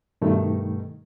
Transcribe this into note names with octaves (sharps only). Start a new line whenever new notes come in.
G2 B2 D#3 A3